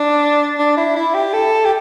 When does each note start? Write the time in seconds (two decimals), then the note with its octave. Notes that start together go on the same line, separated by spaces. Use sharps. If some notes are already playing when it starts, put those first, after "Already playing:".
Already playing: D4
0.59 D4
0.77 E4
0.96 E4
1.14 G4
1.33 A4
1.65 G4